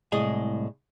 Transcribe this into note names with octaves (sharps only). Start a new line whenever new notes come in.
C2 A2 G#3 G#4 D#5 G#5